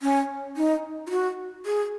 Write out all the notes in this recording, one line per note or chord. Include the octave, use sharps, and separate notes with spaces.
C#4
D#4
F4
F#4
G#4